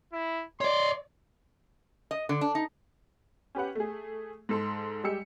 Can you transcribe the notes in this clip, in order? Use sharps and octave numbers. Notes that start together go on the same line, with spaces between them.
E4
C#5 D5 C6
D#5
D3
D4
D#4
C#4 G4 B4 F#5
A3 G#4
G#2 A4 C6
G3 G#3 G4 E6 C#7